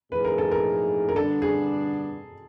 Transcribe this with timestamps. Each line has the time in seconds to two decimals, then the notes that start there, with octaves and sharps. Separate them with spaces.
0.11 A2 F3 A#3 D#4 G#4 B4
0.25 A#4
0.38 A4
0.51 A#4
1.09 A#4
1.15 D3 G3 B3 D4 A4
1.42 G#4